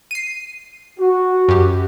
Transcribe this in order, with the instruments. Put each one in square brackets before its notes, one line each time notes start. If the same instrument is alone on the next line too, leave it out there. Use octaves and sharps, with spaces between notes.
[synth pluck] C7 D#7
[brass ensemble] F#4
[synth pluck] F#2 G4